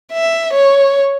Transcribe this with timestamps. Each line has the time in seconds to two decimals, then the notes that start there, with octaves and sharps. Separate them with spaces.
0.12 E5
0.54 C#5